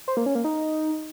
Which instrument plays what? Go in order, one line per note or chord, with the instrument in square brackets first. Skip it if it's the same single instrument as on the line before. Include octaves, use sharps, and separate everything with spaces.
[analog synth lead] C5
A#3
C#4
A#3
D#4